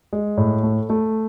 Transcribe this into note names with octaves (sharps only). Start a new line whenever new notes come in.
G#3
A2
A3
A3